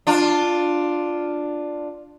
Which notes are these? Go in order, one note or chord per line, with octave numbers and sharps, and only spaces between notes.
D4 F4